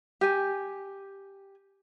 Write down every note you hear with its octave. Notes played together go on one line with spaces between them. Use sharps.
G4 G#5